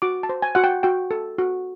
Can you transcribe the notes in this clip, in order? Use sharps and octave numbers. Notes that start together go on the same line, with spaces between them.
F#4 D6
A5
C5
G#5
F#4 F#5
G5
F#4 G5
A4
F#4